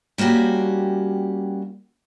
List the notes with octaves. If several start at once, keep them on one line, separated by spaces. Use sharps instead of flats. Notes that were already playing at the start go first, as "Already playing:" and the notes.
G3 A#3 C#4 F#4 G4